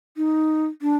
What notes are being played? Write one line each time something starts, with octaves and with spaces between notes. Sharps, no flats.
D#4
D4